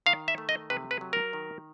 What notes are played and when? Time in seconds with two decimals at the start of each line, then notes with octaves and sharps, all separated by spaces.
0.06 D#3 F5
0.28 E5
0.38 A3
0.49 D#5
0.70 C3 B4
0.91 B4
1.01 F#3
1.13 A#4
1.33 D#3